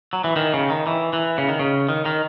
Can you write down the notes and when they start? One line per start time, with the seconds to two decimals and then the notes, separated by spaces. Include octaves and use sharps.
0.13 F#3
0.24 E3
0.36 D#3
0.54 C#3
0.70 D#3
0.87 E3
1.13 E3
1.38 C#3
1.49 D#3
1.59 C#3
1.89 D#3
2.06 D#3